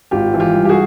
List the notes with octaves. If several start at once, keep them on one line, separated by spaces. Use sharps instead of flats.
G#1 F4 G4
E3
F4 G4
G2
G4
F#4 G#4